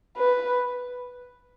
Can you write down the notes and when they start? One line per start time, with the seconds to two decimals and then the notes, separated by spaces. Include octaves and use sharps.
0.17 B4